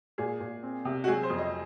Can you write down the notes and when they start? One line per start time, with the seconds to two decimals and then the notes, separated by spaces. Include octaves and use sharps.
0.18 A#2 G#4
0.40 A#2
0.63 C4
0.85 C3
1.04 F#4
1.08 F#3 G#4
1.23 C5
1.30 F2
1.38 D#5